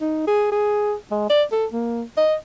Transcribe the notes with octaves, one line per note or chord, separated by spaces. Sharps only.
D#4
G#4
G#4
G#3
D5
A4
A#3
D#5